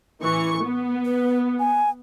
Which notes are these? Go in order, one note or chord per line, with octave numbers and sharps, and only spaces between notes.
A1 E3 C#6
B3
B4
G#5